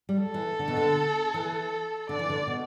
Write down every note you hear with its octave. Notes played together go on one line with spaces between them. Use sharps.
G3
A4
E3
D3
B2
D3
E3
D3 D5
E3
D3
B2